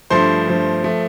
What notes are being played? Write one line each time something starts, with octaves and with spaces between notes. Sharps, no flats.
G2 F3 A3 C5 C6
G2 F3 A3
F3 A3